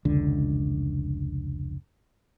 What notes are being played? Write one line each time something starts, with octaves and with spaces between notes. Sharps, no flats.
F1 C#2 D3